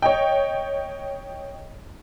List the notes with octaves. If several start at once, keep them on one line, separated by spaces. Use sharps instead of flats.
C#5 D#5 G5